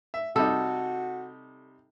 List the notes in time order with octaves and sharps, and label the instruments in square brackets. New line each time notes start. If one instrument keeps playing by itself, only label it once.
[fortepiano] E5
[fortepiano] C3 G3 D#4 [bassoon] F#4 [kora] A4